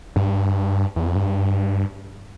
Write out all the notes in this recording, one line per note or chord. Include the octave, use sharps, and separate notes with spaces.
G2
E2
F2
G2